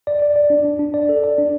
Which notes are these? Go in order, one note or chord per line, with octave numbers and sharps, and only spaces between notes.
D5
D5
D5
D4
D4
D4
D5
A4
D5
D4